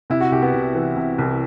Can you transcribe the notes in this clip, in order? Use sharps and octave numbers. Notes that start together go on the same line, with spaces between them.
C3 E4
F#4
C2 G4
B3
C2
E3
C3
C2